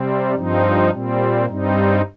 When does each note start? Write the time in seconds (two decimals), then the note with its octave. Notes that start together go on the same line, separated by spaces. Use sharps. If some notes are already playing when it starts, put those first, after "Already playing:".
Already playing: C3 G3 C4
0.35 G2 F3 C4 D#4
0.91 A#2 G3 C4
1.46 G2 G3 C4 D#4